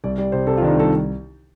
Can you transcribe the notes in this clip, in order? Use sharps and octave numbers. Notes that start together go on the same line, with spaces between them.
C2 D5
G3 D5
C3 C5
C3 A4
F4
D#3 D4
D#4
C2 A4